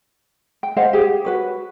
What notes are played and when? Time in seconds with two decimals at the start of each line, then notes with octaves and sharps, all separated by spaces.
0.63 G5
0.77 C5 D#5 F5 F#5
0.93 G4 G#4
1.25 F#4 B4 C#5